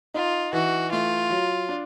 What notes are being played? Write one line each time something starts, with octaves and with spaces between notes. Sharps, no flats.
D#4 F4
E3 F#4
A3 F4
F#3
D4